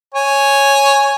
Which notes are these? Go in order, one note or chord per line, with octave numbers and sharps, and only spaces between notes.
C#5 G#5